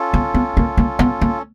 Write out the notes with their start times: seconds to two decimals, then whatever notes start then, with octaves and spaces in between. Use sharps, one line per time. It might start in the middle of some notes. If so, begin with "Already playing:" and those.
Already playing: C#4 F4 A4
0.14 B3
0.34 B3
0.57 A#3
0.77 A#3
0.99 B3
1.21 A#3